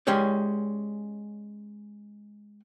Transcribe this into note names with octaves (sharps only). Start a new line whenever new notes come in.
G#3 C#4 G4 C#5 D5